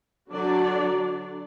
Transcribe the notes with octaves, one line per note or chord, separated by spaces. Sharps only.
D3 F#3 D4 F#4 D5